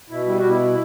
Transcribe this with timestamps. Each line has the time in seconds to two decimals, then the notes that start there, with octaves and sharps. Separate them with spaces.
0.10 B2 E4
0.26 G3 E4
0.38 F#4
0.43 B2
0.49 E4